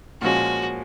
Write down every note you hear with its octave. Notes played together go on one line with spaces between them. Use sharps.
A#2 F3 G#3 C#4 F#4